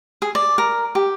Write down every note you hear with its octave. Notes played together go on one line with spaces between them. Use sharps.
G#4
D5
A#4
G4